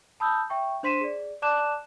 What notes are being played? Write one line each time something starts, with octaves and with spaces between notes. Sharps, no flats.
A5 B5 D#6 E6 G6
E5 G5 C#6
D4 C5 C6 B6 D#7 E7
G#4 D5
D5 A5 D6 F#6 E7